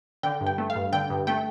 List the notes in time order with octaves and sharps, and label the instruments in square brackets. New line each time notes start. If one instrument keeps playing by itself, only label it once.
[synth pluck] D3 G5
G2
G5
A3
F5
G2
D3 G5
G2
A3 G5